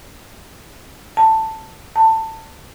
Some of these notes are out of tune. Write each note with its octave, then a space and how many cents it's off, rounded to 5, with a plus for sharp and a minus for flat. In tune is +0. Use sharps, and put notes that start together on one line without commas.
A5 +10
A5 +20